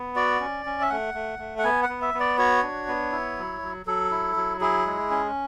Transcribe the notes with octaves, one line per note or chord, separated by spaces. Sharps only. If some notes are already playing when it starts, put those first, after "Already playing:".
Already playing: B3
F#4 D5
C#4
C#4
E5
A3 F#5
A3
A3
F#5
B3 G#5
F#5
B3
E5
B3
D5
F#4 C#5
D4
B3
E4
F#3
F#3
F#3 A4
E4
F#3
E4 G#4
G#3
C#4